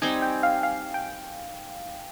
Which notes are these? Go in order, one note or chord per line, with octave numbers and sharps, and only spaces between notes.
G3 C4 D#4 G4 G#5
G5
F5
F5
G5